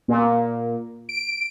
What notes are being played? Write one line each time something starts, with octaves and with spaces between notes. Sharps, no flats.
A#2
D7